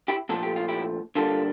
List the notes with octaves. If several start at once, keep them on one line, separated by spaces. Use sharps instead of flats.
E4 G4
A#2 F3 A3 A4
G4
F4
E4 G4
D3 G3 A#3 F4 A4